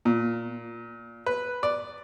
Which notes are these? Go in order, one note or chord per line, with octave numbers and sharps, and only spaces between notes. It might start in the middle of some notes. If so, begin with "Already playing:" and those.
A#2
B4
D5